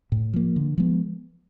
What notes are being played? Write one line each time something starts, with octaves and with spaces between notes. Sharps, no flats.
A2
F3 A#3
D3
F3 G#3 B3